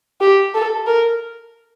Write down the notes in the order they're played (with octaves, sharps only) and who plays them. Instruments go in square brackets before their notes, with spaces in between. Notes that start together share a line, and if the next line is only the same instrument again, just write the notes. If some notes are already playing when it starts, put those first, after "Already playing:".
[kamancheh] G4
A4
A#4